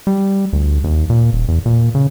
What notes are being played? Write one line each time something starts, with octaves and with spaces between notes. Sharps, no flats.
G3
D2
D#2
A#2
D#1
E2
A#2
C#3